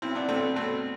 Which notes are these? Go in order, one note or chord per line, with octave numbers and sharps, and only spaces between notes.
B1 C4 E4
B3 D4
B1 A3 C4
B2 A3 C4